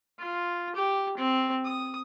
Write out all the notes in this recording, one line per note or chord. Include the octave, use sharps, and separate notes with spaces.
F4
G4
C4
D#6